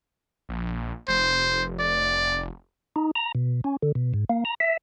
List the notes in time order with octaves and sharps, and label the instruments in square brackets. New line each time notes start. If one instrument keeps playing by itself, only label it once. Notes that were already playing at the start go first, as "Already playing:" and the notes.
[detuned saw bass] A#1
[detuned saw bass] F1 [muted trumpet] C5
[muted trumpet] D5
[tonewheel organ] D#4
A#5
B2
C#4
D3
B2
G#2
A#3
A#5
E5